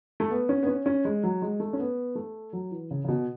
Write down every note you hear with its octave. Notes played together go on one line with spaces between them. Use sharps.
A3
B3
C#4
B3
C#4
C#4
G#3
F#3
G#3
A3
C#4
B3
A3
F#3
E3
C#3
C#3
B2